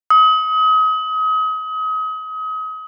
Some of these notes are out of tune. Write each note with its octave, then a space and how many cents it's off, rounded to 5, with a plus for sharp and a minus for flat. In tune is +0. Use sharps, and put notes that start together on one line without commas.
D#6 +35